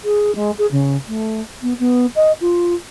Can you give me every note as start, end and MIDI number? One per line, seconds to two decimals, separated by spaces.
0.04 0.34 68
0.35 0.51 56
0.58 0.66 68
0.71 0.96 49
1.07 1.40 57
1.62 1.73 59
1.78 2.06 59
2.15 2.32 75
2.40 2.74 65